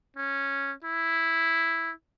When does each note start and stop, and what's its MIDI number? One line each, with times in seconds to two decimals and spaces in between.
0.16 0.72 61
0.84 1.91 64